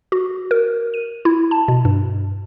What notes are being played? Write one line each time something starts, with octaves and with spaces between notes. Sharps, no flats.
F#4
A#4
D#7
E4
A5
B2
G2